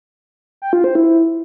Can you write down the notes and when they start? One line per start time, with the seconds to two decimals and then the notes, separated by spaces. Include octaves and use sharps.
0.62 G5
0.73 F4
0.84 C5
0.95 E4